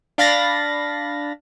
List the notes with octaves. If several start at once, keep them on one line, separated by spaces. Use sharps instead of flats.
D4 F5 B5 A6 A#6